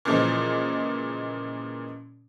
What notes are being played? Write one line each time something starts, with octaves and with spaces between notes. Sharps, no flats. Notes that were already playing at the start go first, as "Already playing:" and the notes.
A#2 C#3 E3 F3 G#3